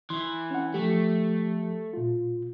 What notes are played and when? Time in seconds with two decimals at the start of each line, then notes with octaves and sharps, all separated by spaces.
0.10 E3 C6
0.51 C#4 F#5
0.74 F3 A3 G4
1.93 A#2 F4